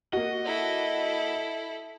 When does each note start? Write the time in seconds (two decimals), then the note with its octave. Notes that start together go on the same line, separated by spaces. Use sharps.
0.13 A#3 F#4 D#5
0.45 E4 A4